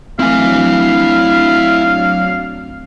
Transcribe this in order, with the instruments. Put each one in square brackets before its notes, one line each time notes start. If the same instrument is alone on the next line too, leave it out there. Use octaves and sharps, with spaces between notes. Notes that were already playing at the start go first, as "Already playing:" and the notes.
[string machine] F#3 D4 [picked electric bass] A3 C4 [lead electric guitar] E4 G#5 [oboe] F5